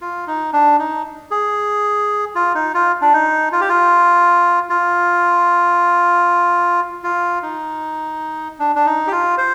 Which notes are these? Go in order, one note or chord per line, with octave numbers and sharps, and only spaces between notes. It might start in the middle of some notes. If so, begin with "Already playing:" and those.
F4
D#4
D4
D#4
G#4
F4
D#4
F4
D4
D#4
F4
G4
F4
F4
F4
D#4
D4
D4
D#4
G4
F4
C5